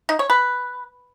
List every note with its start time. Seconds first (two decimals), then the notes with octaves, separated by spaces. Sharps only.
0.09 D#4
0.19 C#5
0.30 B4